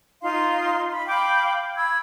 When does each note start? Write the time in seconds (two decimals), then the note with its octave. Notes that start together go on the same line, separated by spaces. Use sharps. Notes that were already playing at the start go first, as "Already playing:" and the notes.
0.21 D#4 F4 F5 C6
0.91 B5
1.08 F5 G5 B5 D6
1.76 B5 E6 G#6